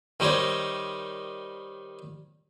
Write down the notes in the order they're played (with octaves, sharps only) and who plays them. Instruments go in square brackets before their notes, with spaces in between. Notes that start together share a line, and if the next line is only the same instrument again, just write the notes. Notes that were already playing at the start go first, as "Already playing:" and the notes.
[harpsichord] D#3 G3 D#4 C5 C#5